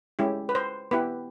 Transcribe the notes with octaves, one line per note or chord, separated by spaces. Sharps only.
G#3 C#4 E4 G4
B4
C5
B3 E4 G4 B4